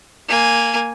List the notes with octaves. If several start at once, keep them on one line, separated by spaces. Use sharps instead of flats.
A#3 G#5